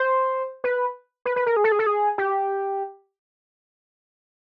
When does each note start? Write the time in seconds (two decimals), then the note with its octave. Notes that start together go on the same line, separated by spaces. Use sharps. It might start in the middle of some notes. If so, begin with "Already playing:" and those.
Already playing: C5
0.64 B4
1.26 B4
1.36 B4
1.46 A#4
1.57 G#4
1.64 A4
1.72 G#4
1.79 A4
1.87 G#4
2.18 G4